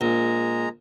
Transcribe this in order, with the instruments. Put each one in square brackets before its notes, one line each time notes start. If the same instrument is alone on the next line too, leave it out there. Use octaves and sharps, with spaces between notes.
[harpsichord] A#1 [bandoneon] G#3 A#5